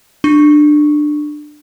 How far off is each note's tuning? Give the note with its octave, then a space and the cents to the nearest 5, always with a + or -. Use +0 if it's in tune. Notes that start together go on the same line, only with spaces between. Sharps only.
D4 +20 C#6 +0